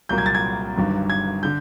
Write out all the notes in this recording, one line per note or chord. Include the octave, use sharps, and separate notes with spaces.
C2 A#2 F#3 A#3 G6
G#6
A6
G#6
G1 G2 D#3 F#3
G#6
D3 G6